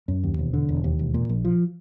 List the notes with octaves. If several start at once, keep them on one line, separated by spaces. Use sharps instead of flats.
F#2
D#2
E1
D3
E1
D#2
E1
A#2
A#1
F3